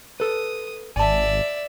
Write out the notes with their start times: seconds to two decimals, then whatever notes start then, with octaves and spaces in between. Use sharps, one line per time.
0.20 A4 B4 D#6
0.96 G#1 D5 E5 G#5 A5